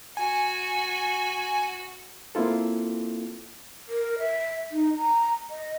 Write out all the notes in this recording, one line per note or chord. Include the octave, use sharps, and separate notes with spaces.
F#4 G#5
A#3 C4 E4 F4 A4
A#4
E5
D#4
A#5
D#5